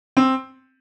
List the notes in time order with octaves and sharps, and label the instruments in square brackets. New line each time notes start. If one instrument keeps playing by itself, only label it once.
[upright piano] C4